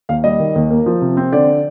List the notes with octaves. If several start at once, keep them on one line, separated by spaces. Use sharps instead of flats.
D#2 F5
G3 D#5
D#3
D#2
A#3
F3
C3
C4
D3 D5